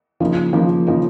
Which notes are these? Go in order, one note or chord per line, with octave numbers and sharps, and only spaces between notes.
C#3 F3 A#3 D#4
C#3 F3 A#3 D#4
C#3 F3 A#3 D#4